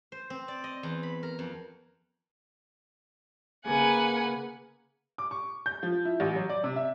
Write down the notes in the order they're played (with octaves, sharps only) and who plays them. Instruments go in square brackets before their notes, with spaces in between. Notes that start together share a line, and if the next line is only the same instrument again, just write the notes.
[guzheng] C5
C4
D5
D#5
E2
B5
A#4
F2
[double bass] C#3 A#3 [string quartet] B4 F#5 G#5
[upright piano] D6
C#6
G6
F3
E4
A1
F#3
D5
C3
E5